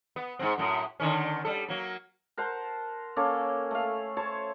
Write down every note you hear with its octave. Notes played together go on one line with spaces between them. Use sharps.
B3
G#2 C3 C4
F#2 A2
D3 D#3 C#4
G3 A4
F#3 A#3
A#4 C5 F#5 A5
A#3 C#4 A4 C#5
A3 F5
C5 C#5 A5